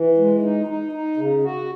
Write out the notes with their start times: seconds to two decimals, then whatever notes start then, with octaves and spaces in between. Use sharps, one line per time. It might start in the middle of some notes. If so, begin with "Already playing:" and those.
Already playing: E3
0.18 G#3
0.42 D#4
0.67 D#4
0.92 D#4
1.17 C#3
1.43 F#4